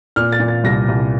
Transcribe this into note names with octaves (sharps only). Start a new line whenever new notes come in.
A#2 F6
A6
A#2
A6
C2 A#6
C2